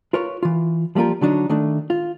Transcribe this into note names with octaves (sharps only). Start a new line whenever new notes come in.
F4 A#4 B4 C#5
E3 F4
F3 G3 A#3 F4 A#4
D3 F#3 D4 D#4
D#3 A3 D4
F4